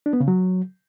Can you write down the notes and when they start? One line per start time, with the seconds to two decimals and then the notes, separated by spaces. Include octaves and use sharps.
0.06 D4
0.13 B3
0.20 C#3
0.28 F#3